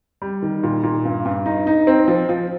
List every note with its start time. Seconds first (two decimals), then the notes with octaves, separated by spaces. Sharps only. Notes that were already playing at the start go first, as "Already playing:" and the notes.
0.22 G3
0.42 D#3
0.63 A#2
0.83 A#2
1.05 G2
1.25 G2
1.46 D#4
1.67 D#4
1.87 C4
2.08 F3
2.29 F3